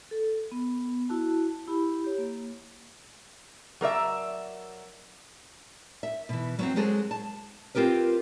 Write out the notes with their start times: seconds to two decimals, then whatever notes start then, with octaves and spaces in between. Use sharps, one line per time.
0.11 A4
0.52 B3
1.09 E4 F#4 A5
1.68 E4 G4 B5
2.04 G4 C#5
2.18 A#3
3.81 F#3 A#4 D5 E5
6.03 E5
6.29 B2 E3
6.59 F#3 B3 C4
6.76 F#3 G#3 G#4 A4 C5
7.11 A5
7.75 C4 F4 G4 A#4 B4